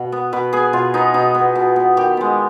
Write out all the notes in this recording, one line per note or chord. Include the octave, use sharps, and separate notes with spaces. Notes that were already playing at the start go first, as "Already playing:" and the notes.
Already playing: B2 B4
B3
B2 B4
B3 G#4
B2 F4
B3 D#4
B2 D#4
B3
B2
B3
D#3 G4
G#3 B3